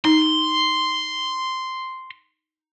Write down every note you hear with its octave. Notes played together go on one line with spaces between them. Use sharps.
D#4 C6